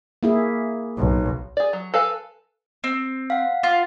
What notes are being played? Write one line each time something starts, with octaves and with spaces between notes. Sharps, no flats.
A#3 E4 G#4
B1
G#4 D5
F#3
A4 B4 F5 G#5
C4
F5 F#5
F4